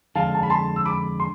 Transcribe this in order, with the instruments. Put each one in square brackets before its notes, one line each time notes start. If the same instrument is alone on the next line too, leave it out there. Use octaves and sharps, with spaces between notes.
[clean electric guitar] F2 D3 G#3 [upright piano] F5 A5
[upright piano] A5
B5
A5 C6
E6
B5 D6
C6